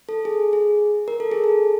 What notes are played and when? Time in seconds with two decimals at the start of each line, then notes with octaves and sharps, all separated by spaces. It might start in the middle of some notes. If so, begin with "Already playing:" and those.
0.09 A4
0.25 G#4
0.53 G#4
1.08 A#4
1.20 A4
1.31 G#4
1.44 A4